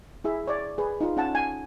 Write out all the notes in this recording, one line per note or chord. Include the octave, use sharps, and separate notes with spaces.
E4 G#4 E5
C#5 D5
G#4 B4
D#4 F4
C#4 F#5 A5
G#5